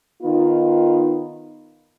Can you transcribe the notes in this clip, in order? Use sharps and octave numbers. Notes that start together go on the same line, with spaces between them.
D#3 B3 D#4 F4